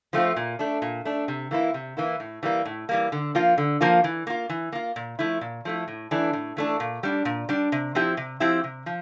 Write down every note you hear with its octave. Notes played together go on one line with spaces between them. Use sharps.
F3 A3 C4 F4
A#2
A3 D4
A#2
A3 D4
C3
E3 A#3 E4
C3
E3 A#3 E4
A2
E3 G3 A#3
A2
E3 G3 A#3
D3
F3 A#3 F4
D3
F3 A#3 F4
E3
A#3 F4
E3
A#3 F4
A#2
F3 A3 E4
A#2
F3 A3 E4
A2
E3 A3 D4
A2
E3 A3 D4
A#2
G3 D4
A#2
G3 D4
C3
F3 C4 E4 G4
C3
F3 C4 E4 G4
C3
F3